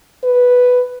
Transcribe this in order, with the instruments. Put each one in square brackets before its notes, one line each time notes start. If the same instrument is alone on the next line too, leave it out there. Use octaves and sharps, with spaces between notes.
[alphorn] B4